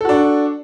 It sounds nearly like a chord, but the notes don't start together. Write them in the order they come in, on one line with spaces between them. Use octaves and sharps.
A4 F#4 D4